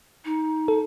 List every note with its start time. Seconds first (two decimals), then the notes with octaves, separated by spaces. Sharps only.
0.25 D#4
0.68 A4